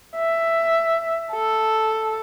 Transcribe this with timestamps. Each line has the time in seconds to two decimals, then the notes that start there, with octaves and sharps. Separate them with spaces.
0.17 E5
1.33 A4